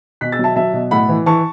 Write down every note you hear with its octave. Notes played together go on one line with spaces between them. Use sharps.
B2 F#6 B6
E6 A6
F#3 E5 A5
F#3 E5 A5
B2
A2 F#5 B5
E3
E3 A5 C#6